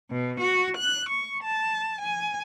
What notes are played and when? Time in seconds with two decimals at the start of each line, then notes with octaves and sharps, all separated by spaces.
0.11 B2
0.40 F#4
0.77 F#6
1.09 C#6
1.44 A5
2.01 G#5